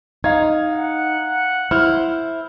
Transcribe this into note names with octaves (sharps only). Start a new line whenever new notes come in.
D#4 F5 G#6
F#5
E4 C5 F6